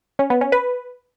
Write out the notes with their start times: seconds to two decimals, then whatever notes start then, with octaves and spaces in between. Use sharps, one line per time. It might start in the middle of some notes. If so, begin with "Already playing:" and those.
0.19 C#4
0.30 B3
0.41 C#4
0.52 B4